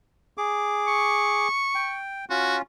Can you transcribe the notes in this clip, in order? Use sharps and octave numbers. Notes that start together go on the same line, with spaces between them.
G#4 D6
C#6
G5
C#4 F4 F#4